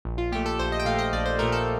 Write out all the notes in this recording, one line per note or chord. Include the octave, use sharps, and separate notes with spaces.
A#1
F4
A#2 A3 G4
A4
A#1 C5
D#5
G5
A#2 A3 F5
D#5
A#1 D5
C5
A#2 A3 A#4
A4